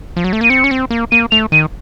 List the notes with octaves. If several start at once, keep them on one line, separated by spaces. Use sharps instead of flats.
F3
F#3
A3
A#3 D#7
C4 C#7
C#4
C4
A#3
A#3 D#7
A3 F7
D#3 D#7